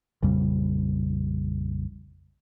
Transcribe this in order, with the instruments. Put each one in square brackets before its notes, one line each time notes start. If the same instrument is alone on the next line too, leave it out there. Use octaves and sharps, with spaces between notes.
[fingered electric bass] A#1 F2 C#3 G3